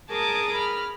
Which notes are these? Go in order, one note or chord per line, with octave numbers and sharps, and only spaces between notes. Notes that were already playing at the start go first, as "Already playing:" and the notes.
G#4 A#4 A5 D6 D#6
B5 F6